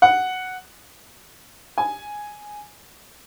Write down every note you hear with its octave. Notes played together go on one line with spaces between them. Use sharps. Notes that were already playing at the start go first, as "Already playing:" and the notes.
F#5
G#5